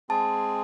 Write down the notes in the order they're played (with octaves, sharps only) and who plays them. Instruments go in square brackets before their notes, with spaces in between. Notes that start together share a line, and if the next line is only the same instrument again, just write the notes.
[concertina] G#3 C4 G#4 [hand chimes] A5